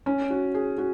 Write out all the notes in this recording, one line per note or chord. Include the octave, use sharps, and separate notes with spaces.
C#4
F#4
G#4
F#4